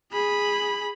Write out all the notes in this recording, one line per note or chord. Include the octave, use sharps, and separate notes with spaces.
G#4 B5